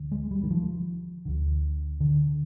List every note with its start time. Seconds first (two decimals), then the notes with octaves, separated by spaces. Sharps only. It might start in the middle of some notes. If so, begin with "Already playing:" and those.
Already playing: D2 D3
0.12 G#3
0.31 G3
0.43 D#3
0.50 F3
1.25 D2 D3
2.00 D3